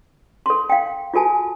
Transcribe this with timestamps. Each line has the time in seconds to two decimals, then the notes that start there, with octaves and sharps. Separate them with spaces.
0.46 A4 C6
0.70 F5 G5
1.14 F4 F#4 A4 G#5 A5